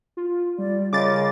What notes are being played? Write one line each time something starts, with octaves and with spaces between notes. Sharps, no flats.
F4
G3 D5
C#3 F4 A#4 D#5 D6 A6